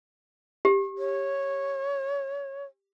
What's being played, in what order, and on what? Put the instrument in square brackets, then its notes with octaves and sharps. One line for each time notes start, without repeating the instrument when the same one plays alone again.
[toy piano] G4
[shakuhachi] C#5